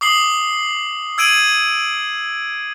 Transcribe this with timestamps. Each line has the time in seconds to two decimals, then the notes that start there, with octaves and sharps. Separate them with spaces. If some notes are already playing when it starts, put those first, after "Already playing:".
0.01 D6 D#6 C7 F#7 G7
1.18 E6 G#6 D7 D#7 F#7